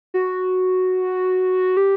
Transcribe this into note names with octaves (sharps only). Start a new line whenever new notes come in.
F#4
G4